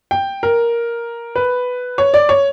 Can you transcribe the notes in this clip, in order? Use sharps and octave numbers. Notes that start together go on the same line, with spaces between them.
G5
A#4
B4
C#5
D5
C#5